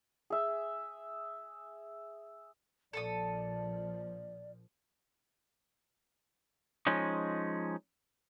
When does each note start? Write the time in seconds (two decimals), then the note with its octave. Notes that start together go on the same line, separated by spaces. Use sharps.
0.30 G#4 E5
2.93 A#1 A#2 F3 A4 D5 A5 D#6
6.87 F3 G#3 C#4 D#4